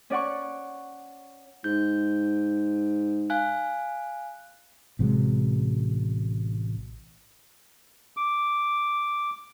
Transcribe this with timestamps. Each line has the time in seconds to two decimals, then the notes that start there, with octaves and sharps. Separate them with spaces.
0.10 C#4 D5 F#5 C#6
1.64 G#2 G6
3.30 F5 G#5 F#6
4.99 A1 C3 F#3 G#3
8.17 D6